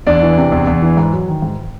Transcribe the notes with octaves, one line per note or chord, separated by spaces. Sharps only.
E2 D4 D5
E3
C3
E2
E2
E3
G#2
F#3
D#3
G#2